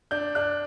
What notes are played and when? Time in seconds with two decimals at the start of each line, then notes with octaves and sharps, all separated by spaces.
0.11 D4 G6
0.35 D4 F#6